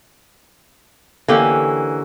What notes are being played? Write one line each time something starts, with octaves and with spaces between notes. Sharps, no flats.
D3 E3 A#3 C#4 G4